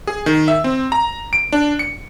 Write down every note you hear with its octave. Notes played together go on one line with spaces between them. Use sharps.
G#4
D#3
E5
C4
A#5
D7
D4
C#7